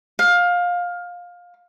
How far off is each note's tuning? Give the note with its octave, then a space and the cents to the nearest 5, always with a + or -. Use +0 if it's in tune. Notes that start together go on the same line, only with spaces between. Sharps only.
F5 +20